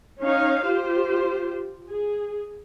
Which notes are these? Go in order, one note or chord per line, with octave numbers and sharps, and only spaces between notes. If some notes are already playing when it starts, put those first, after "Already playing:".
C#4 D#4 C#5 F5
F4 G4 C5
G#4